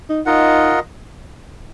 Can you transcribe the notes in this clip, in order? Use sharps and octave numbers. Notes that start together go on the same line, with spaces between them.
D#4
D#4 F4 A#4 D#5 F#5